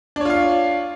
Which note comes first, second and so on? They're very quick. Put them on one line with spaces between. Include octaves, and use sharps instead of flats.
D4 C#5 F4 F5